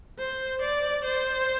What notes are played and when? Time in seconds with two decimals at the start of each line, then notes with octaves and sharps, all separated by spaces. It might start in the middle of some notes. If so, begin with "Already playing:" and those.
0.19 C5
0.61 D5
1.04 C5